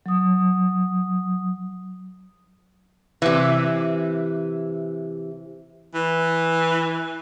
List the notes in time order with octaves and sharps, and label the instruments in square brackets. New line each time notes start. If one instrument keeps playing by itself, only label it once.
[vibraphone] F#3 D#6
[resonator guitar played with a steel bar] C3 E3
[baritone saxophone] E3